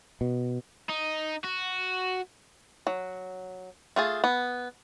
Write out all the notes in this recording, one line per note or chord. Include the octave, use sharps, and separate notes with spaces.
B2
D#4
F#4
F#3
A3 F4 G#4
B3